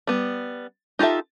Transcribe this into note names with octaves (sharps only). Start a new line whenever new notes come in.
G3 B3
D#4 F4 G4 A4 E5